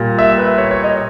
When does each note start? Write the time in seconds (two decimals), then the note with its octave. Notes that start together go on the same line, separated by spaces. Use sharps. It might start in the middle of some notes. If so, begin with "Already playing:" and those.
Already playing: A#2 G3
0.19 E5
0.38 B4
0.58 C#5
0.71 C#5
0.84 D#5